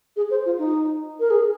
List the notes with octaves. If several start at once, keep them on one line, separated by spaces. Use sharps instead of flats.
G#4
C5
F4
D#4
A#4
G#4